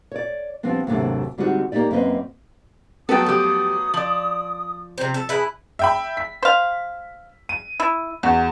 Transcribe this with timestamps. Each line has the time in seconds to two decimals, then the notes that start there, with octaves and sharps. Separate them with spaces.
0.12 C#5 D5
0.63 F3 G3 B3 C4 D4
0.87 D#2 G#2 C3 F#3 A3 D4
1.38 D3 G3 G#3 C4 D#4 F#4
1.72 A#3 C4 D#4 G4 D5
1.91 F#2 A#3 C4 B4 C5 D#5
3.09 F#3 A3 B3 A4 G5 D#6
3.26 F3 G4
3.94 F3 D5 F#7
4.98 C3 C4
5.14 A4
5.29 E4 G#4 B4
5.79 E5 G5 B5
6.17 B6
6.43 C5 F5
7.49 D#7
7.80 E4
8.23 E2 F#4